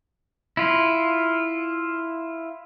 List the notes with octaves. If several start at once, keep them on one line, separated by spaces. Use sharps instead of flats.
E4 F4